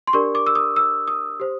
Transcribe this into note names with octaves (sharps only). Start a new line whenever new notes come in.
C6
D4 G4 A#4 D5 C#6
D6
E6
D#6
E6
D#6
G4 C5